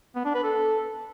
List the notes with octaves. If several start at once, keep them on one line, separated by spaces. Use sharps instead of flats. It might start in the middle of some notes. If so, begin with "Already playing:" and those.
B3
D4
B4
A4